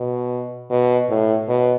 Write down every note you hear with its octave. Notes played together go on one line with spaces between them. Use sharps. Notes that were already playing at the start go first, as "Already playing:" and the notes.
Already playing: B2
B2
A2
B2